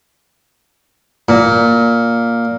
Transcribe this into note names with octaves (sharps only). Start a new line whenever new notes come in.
A#2